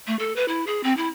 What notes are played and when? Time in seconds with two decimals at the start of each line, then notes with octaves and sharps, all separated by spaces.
0.07 A3
0.19 A4
0.36 B4
0.48 E4
0.67 G#4
0.83 C4
0.97 E4